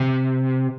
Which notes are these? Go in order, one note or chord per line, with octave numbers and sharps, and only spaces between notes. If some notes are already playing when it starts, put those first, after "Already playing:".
Already playing: C3